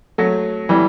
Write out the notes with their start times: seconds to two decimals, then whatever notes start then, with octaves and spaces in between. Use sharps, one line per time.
0.18 F#3 A3
0.69 E3 G3